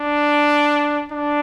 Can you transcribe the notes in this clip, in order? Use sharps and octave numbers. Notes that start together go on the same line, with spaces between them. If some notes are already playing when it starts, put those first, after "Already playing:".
Already playing: D4
D4